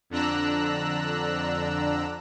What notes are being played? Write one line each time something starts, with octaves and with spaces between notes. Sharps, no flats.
F2 D3 D4 A#5 E6 F#6